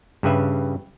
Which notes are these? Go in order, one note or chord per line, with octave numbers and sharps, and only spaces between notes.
G2 C#3 G4 B4 E5